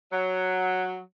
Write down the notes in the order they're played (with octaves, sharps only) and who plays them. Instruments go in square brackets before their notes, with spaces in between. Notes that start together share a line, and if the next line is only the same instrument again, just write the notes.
[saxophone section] F#3